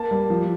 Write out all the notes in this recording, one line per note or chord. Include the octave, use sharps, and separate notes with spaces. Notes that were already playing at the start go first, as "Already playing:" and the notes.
Already playing: A#3 A5
G3
F3